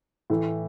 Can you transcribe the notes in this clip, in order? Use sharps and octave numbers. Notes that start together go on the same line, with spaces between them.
A2 E3 A3